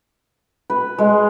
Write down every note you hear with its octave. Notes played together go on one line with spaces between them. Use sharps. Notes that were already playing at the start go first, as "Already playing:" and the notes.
B4
G#3